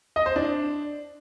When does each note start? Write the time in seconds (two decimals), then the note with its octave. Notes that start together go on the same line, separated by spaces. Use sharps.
0.16 D#5
0.26 C5
0.36 D4